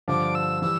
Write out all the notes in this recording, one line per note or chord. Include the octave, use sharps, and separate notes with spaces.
G2 D3 F3 D6
E6
E3 G3 E6